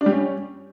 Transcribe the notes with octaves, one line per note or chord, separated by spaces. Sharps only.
D4
G3
C#4